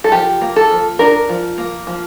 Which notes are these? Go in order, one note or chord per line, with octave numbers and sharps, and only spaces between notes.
A4
F3 G4
A#3
A4
F3
D4 A#4
F3
A#3
F3